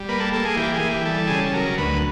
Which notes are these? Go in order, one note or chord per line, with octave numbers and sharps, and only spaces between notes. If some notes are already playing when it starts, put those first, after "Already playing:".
Already playing: G3
A#3 B4
A4
A#3 A4
G#4
E3 G4
G#4
E3
G4
G3 A4
C#3 G#4
A4
F#3 A#4
D2 B4